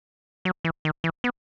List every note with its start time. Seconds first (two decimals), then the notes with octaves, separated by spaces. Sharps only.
0.45 F#3
0.65 E3
0.85 D#3
1.04 E3
1.24 B3